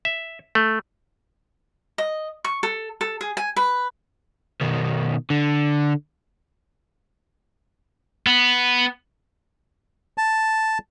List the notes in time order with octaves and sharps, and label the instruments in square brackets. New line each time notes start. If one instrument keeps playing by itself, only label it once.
[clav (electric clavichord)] E5
A3
[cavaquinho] D#5
C#6
A4
A4
G#4
G#5
B4
[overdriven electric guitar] B2 D#3
D3
[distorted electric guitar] B3
[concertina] A5